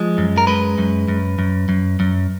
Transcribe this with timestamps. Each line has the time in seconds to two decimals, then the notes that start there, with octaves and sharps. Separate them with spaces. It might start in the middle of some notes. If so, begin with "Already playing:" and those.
Already playing: F3 G#3
0.18 F#2
0.38 A#4
0.47 G#3 B4
0.78 F#2
1.08 F#2
1.39 F#2
1.69 F#2
2.00 F#2